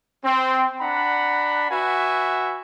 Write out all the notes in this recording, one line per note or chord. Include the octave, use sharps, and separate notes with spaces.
C4
D4 F#5 A#5 B5
F#4 B4 E5 G#5